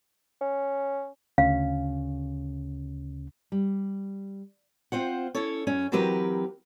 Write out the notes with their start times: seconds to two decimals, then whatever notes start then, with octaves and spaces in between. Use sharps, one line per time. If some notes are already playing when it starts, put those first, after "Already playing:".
0.41 C#4
1.38 D2 C#3 C#4 F5
3.52 G3
4.92 C4 F4 C5 F#5
5.35 C#4 E4 A4 C#5
5.67 F#2 C#4
5.92 E3 F#3 C4 G4 A#4 B4